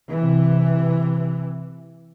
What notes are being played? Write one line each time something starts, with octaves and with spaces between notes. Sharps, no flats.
C3 E3